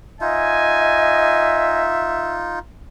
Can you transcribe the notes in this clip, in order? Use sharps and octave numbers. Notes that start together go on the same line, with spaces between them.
D#4 F4 D#5 E5 G#5